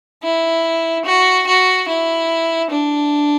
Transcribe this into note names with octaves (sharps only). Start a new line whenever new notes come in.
E4
F#4
F#4
E4
D4